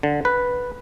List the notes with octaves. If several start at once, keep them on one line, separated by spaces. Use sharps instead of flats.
D3
B4